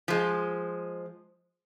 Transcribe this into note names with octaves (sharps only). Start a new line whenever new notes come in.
F3 G#3